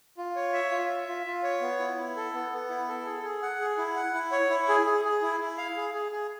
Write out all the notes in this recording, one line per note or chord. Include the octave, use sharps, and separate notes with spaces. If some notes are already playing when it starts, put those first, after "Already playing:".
F4
C#5
E5
F4
E5
F4
F4
C#5
B3
E4
E4
A4
B3
B3
E4
A4
G#4
G#4
F#5
G#4
E4
F#5
E4
C#5
E4
G#4
G#4
G#4
E4
E4
F5
G#4
G#4
G#4